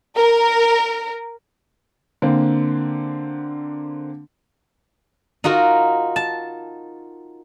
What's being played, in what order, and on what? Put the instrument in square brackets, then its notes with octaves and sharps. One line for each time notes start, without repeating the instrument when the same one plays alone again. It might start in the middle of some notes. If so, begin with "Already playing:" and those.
[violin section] A#4
[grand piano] D3 A#3 C4
[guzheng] D#4 F4 F#4 A#4
A5